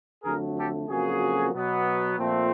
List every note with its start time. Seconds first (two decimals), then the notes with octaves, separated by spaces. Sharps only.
0.24 F2 D3 F#3 A3 G#4 A#4
0.57 G4 A4
0.89 F2 C#3 F#3 A#3 F#4 G#4
1.54 B2 F#3 B3
2.18 A#2 F3 A3 C4